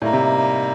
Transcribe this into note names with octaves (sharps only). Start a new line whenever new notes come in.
A2 G3 A#3 D#4
C3